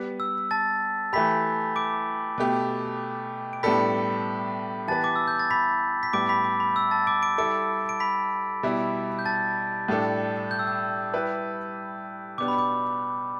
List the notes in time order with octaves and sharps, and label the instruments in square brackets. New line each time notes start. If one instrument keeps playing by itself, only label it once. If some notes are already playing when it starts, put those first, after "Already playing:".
Already playing: [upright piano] G3 B3 G4 B4
[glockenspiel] E6
A5 A6
[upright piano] E3 A3 G4 [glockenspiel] B5 B6
[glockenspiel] D6 D7
[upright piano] B2 A3 G4
[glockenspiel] D7
[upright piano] A2 G3 B3 D4 A4 [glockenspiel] B5 B6
[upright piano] E3 B3 G4 B4 [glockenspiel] A5 A6
[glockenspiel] D6
E6
G6
A6
B5 B6
B6
[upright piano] A2 G3 B3 [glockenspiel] D6 D7
[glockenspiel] B5 B6
D6
B5
E6
A5 A6
D6 D7
D6 D7
[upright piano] G3 E4 A4 [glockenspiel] D6 D7
[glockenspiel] D7
B5 B6
[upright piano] B2 G3 E4
[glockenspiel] G6
A5 A6
[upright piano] A2 G3 D4 A4
[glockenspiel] G6
E6
G6
[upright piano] G3 E4 G4 B4
[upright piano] B2 B3 D4 G4 [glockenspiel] D6
[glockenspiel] B5
D6